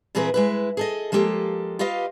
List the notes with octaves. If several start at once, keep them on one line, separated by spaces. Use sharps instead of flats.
A#2 E3 C4 G#4 A#4 B4
G#3 E4 B4
G#4 A4 D#5
F3 G#3 A#3 G4 A4
F4 G4 B4 D#5 F5